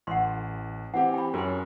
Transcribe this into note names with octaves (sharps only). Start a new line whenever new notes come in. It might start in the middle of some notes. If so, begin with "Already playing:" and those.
A1 F#5 C6
E3 C4 G4 F#5
G5 B5
F#2 C#4 A#4 C6